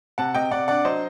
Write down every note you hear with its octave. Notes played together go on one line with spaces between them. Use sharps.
C3 F#5 A5
C3 D#5 G5
C3 D5 F#5
D4 D5 F#5
F#3 C5 D#5